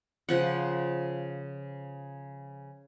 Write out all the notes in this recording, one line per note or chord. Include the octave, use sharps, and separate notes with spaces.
C#3 F3 F#5